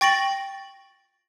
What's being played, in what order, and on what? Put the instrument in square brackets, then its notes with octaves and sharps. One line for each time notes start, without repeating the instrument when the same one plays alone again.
[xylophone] G5 C#6 A6 A#6 D7 F#7